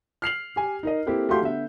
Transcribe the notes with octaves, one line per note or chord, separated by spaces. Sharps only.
F6 C7 F7 F#7
G4 G#5
D#4 A#4 D#5
A#3 C4 E4 G4 A4
A3 F#4 G4 F5 C6 G6
D3 B3 E5